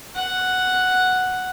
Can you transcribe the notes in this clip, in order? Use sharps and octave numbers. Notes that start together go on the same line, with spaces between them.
F#5